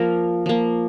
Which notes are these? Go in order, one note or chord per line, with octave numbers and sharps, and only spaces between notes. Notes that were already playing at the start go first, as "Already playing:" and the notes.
Already playing: F3 A#3 A#4
F3 A#3